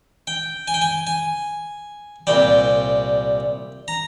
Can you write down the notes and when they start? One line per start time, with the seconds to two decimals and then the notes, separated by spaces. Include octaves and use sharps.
0.27 G5
0.68 G#5
0.74 G5
0.82 G#5
1.07 G#5
2.27 C2 A#2 G3 G5
3.88 A#5